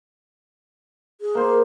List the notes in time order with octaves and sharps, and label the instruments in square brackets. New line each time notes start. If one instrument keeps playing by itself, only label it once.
[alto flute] G#4
[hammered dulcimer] A#3 C5